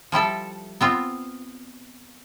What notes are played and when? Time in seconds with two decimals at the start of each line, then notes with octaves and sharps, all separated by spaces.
0.12 F3 G3 E4 A4
0.81 B3 C4 F4